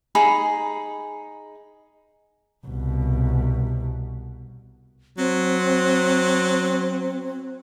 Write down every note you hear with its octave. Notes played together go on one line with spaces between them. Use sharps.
D#4 G#4 A#5 B5
C2 B2
F#3 C4